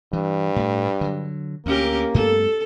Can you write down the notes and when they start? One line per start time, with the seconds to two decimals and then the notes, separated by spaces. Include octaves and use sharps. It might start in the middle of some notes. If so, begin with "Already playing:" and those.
0.13 G2 E3
0.56 A2 A3
1.01 D3 F#3
1.66 D2 A#3 C#4 G4 A#4
2.14 G2 A3 B3 A4